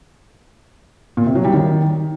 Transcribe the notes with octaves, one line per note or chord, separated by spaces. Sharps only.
A#2
C3
F#3
G3
D#3